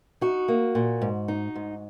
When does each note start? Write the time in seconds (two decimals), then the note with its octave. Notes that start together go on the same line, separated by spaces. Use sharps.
0.21 D#4 F#4
0.48 A#3
0.75 A#2
1.02 G#2
1.28 D#4
1.55 G#2